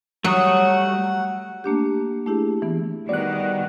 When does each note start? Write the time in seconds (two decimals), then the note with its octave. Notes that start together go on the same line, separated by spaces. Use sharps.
0.24 F#3 G3 A3 F#4 F#5 D#6
1.64 A3 A#3 D4 G4
2.26 A3 D4 E4 G4 G#4
2.62 E3 B3
3.09 D#3 G3 B3 F#4 D5 F#6